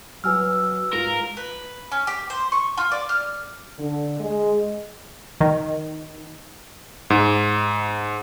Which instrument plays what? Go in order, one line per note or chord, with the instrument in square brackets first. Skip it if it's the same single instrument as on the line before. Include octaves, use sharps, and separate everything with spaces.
[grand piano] F#3 [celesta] B4 G#5 F6 [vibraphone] E6
[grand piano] G#2 F4 [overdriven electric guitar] A#4
[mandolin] B4
C#4
G4
C5
C#6
F4
D5
F6
[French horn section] D3
G#3
[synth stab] D#3
[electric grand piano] G#2